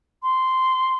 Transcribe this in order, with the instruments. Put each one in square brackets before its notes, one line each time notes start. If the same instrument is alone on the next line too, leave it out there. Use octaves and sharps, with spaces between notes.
[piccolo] C6